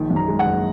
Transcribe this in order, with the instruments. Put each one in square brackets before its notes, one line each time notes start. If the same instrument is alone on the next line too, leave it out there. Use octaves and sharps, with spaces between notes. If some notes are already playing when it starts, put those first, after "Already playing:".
Already playing: [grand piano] A#1 D#3
F#2
A#5
G#3
F#5
F#1